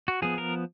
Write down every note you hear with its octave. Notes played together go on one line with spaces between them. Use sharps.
F#4
F3 B3 G#4
A#4